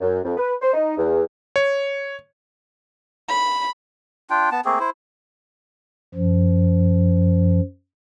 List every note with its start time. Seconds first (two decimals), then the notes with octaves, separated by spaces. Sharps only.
0.01 F#2
0.24 F2
0.37 B4
0.62 C5
0.74 D#4
0.97 E2
1.56 C#5
3.29 B5
4.30 D4 F4 G5
4.52 B3 A5
4.65 A3 A#3 C4 G#4
4.80 E4 C5
6.14 F#2 F3